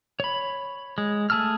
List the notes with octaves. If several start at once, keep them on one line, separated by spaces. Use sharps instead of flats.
C#5 B5
G#3
A3 G#4 A5 E6 F6